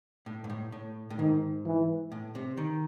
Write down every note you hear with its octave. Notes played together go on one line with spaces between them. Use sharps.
A2
G#2
A2
A2
A2
G#2 D#3
E3
A2
C3
D#3